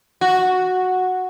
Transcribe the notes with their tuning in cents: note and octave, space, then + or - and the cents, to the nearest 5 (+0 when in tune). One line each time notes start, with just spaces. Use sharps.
F#4 -5